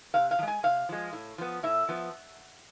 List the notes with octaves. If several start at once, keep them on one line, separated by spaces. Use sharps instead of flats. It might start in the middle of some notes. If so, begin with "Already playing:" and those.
C3 F5
F5
F3
G#3 G#5
C3 F5
F3 G#3
A2
F3 B3
A2 E5
F3 B3